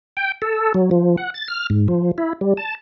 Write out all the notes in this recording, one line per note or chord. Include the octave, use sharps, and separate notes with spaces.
G5
A4
F#3
F3
F#5
A6
F6
G#2
F3
E4
G3
A5